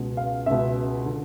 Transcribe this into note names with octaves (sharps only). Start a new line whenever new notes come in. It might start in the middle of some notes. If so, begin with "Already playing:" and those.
Already playing: C#2 B2
F5
C#2 B2 E5
D3